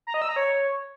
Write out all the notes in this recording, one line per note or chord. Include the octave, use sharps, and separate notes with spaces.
A#5
D#5
E6
A#5
C#5